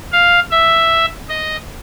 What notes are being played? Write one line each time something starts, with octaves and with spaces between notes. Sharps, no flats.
F5
E5
D#5